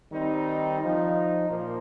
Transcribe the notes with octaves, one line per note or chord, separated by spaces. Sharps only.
D#3 G3 C4 D#4
F3 D#4
A#2 F3 A#3